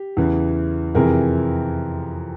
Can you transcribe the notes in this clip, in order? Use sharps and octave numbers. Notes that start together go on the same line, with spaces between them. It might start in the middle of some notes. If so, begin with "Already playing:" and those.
Already playing: G4
E2 C#3 E3
F2 C3 E3 G#4 A#4